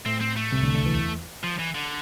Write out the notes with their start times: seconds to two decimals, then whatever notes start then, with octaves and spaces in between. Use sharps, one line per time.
0.06 A2 A3 C4
0.21 C4
0.37 A3
0.52 C2 C3
0.63 D2 D3
0.75 D2 D3
0.86 E2 E3
1.44 F3
1.59 E3
1.75 D3